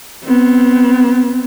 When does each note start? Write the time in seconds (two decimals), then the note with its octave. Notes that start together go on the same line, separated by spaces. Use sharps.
0.24 B3 C4